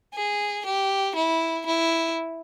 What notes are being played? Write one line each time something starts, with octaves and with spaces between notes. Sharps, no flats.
G#4
G4
E4
E4